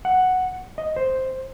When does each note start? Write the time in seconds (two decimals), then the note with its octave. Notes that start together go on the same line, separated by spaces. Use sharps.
0.05 F#5
0.78 D#5
0.96 C5